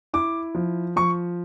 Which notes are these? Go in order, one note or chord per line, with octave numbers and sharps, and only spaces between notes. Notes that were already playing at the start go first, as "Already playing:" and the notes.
E4 D6
F3
F3 C#6